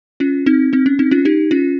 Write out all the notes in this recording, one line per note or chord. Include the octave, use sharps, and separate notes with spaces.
C#4 F4
C4 D#4
C4 D#4
C#4
C4 D#4
C#4 F4
D#4 G4
C#4 F4